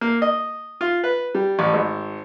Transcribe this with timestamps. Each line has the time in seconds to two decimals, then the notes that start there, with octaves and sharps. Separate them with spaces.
0.01 A#3
0.22 D#5
0.81 F4
1.04 B4
1.35 G3
1.59 A1
1.73 G#1